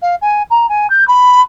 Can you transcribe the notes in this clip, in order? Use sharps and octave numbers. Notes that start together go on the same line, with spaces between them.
F5
G#5
A#5
G#5
G6
B5